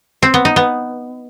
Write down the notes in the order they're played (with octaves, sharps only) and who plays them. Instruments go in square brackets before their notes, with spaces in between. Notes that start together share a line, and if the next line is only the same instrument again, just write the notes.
[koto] C4
B3
D#4
B3